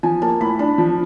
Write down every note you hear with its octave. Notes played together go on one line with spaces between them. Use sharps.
F3 G#5
A#3 A5
A2 B5
D4 B5
F3